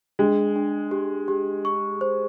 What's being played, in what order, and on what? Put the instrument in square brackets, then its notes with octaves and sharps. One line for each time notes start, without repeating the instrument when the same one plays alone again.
[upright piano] G#3 [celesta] D4
[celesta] D4
G4
G4
C#6
C5